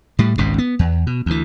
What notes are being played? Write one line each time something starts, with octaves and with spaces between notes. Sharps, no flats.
A2 G3
G#1 C#2 G#2 B2
B3
E2
B2
D2 E3